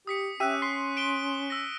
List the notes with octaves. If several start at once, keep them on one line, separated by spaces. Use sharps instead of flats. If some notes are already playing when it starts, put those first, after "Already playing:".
G4 D#6 B6 C#7
C#4 G4 E5 F#6 D#7
C6 B6
D7 E7 G7
E6 A#6